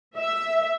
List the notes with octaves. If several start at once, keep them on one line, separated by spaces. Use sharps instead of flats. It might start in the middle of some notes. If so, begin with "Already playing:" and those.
E5